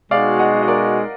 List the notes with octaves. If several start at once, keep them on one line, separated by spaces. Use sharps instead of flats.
B2 G#3 D#4 F#4 D5 F5
D#5 F#5
D#5
A#4 D5